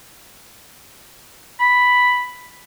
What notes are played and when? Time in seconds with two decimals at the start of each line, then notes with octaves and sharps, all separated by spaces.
1.60 B5